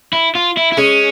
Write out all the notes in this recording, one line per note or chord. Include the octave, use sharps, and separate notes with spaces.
E4
F4
E4
E4
G#3 C#4